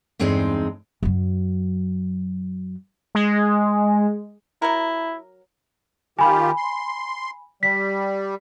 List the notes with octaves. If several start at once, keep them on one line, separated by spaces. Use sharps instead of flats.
E2 G2 G#3 C4 D#4
F#2 F#3
G#3
F#3 E4 A#4
D#3 F4 G4 G#5 B5
C6
G3 B6